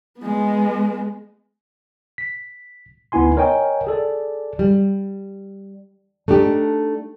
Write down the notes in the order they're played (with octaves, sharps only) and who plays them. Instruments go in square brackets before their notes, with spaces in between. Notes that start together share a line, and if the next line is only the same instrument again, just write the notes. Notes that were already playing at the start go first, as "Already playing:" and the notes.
[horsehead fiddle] G#3 B3
[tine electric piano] B6
D2 B3 D#4 E4 G#5 C6
A#4 C#5 D#5 G5 G#5
G#4 A4 D5
[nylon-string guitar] G3
A3 D4 D#4 G4